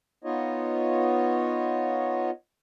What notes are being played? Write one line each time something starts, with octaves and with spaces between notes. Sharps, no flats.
B3 D#4 F4 C#5 D#5